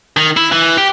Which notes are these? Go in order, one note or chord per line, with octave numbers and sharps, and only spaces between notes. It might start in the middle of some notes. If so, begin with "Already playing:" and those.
D#3
E4
E3
G4